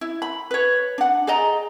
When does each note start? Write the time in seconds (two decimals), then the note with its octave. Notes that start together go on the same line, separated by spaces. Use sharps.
0.01 E4
0.22 B5
0.51 B4 C#5
0.98 D4 F#5
1.27 G#4 D5 D#5 A#5